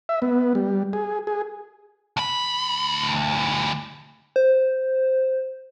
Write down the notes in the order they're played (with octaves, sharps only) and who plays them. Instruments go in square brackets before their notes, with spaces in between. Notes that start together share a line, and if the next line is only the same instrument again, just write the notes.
[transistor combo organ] E5
B3
G3
G#4
G#4
[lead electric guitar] D2 B5
[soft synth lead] C5